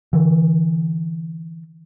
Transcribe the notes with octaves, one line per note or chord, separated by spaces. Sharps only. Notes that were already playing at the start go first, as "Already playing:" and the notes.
D3 E3